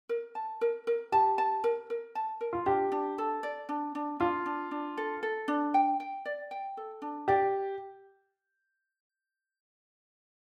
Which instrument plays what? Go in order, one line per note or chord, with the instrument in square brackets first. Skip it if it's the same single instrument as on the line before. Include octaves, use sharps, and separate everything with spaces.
[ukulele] A#4
A5
A#4
A#4
[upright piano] G4 [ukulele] A5
[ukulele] A5
A#4
A#4
A5
A#4
[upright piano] F4
[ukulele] D4 [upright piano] G4
[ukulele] D4
A4
D5
D4
D4
[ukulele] D4 [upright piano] F4
[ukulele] D4
D4
A4
A4
D4
G5
G5
D5
G5
A4
D4
[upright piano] G4 [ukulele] D5